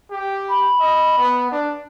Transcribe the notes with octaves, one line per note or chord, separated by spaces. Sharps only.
G4
B5
D#5
B3
D4